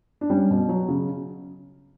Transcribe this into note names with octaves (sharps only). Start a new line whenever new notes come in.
D4
G3 C#4
B2
F#3
C#3